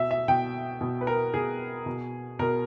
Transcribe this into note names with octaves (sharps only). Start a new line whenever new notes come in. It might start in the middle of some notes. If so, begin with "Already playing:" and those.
Already playing: B2 E5
E5
B2 G5
B2
B4
A#4
B2 G#4
B2
B2 A#4